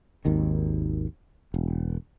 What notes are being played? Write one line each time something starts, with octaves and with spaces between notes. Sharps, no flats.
G#1 D#2 D#3
E1